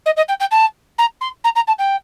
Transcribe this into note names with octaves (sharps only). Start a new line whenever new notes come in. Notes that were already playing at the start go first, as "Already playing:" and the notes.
D#5
D#5
G5
G5
A5
A#5
C6
A#5
A#5
A5
G5